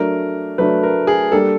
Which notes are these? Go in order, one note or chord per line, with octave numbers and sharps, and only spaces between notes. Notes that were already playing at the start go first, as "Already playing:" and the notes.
Already playing: F#3 A3 D4 A#4
F#3 A3 D4 B4
A#4
G#4
G3 A#3 D4 G4 A4 A#4